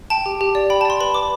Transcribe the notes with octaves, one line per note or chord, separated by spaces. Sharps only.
G5 A5
G4
G4
D5
G5 B5
A5
D5 C6
B4 B5
B4 D6